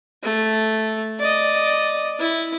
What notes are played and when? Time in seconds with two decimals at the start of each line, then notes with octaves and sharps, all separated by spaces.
0.23 A3
1.20 D5 D#5
2.20 E4